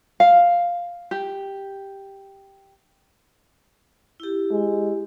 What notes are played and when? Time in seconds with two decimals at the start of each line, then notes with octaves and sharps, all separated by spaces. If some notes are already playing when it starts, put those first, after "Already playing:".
0.20 F5
1.11 G4
4.20 E4 G4
4.51 G#3